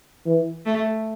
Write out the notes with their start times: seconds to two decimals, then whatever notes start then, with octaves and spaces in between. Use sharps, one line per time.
0.26 E3
0.65 A3